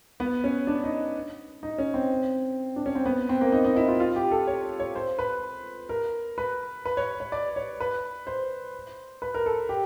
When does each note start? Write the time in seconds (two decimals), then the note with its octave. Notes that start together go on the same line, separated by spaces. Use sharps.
0.20 B3
0.44 C#4
0.67 D4
0.84 D#4
1.63 D#4
1.78 C#4
1.94 C4
2.76 D4
2.86 C#4
2.95 C4
3.06 B3
3.29 C4
3.41 A#3
3.52 D#4
3.64 D#4
3.76 E4
3.88 F4
4.00 F4
4.16 G4
4.31 A4
4.47 C#5
4.80 C#5
4.96 C5
5.19 B4
5.89 A#4
6.38 B4
6.85 B4
6.97 C#5
7.20 C#5
7.32 D5
7.56 C#5
7.80 B4
8.27 C5
9.22 B4
9.34 A#4
9.46 A4
9.69 G4